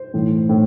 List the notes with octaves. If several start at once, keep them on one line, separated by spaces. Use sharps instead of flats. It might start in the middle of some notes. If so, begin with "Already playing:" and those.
Already playing: C5
A2 E3
A2